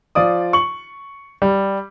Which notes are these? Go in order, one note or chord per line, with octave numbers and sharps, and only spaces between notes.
F3 F4 D5 D#6
C#6 F#7
G3